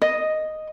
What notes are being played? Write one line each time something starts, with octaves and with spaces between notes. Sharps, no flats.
D#5